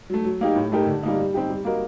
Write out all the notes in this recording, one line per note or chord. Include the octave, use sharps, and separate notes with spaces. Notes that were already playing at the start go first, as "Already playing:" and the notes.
F#3 A3
F#3
A#3 D#4 G4
A2
A3 D#4 G4 A#4
D3
G3 A#3 D#4
G3
C4 D#4 G4
G3
A#3 F#4 A#4 D#5